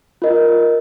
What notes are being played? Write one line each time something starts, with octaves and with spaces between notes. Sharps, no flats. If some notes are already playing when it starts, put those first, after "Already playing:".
F4 A#4 D#5